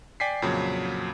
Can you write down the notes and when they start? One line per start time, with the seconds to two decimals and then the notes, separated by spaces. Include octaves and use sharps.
0.20 D5 G5 G#5 B6 C7
0.42 F2 A#2 C#3 F#3